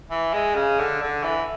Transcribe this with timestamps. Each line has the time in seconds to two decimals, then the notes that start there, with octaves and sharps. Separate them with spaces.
0.11 E3
0.33 G#3
0.55 C#3
0.79 D3
1.02 D3
1.23 E3